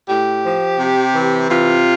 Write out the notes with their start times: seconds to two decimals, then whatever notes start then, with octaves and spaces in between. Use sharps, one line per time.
0.09 A2 G4
0.44 F3
0.79 C3
1.14 E3
1.49 C3 F4